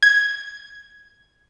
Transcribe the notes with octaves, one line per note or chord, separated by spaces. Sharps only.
G#6